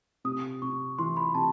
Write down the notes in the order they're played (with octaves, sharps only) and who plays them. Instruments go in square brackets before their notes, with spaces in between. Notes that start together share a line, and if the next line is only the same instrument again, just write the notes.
[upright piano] C3 [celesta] D#6
[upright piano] C3 [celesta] C#6
[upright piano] E3 [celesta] C6
[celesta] B5
[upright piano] C3 [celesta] A5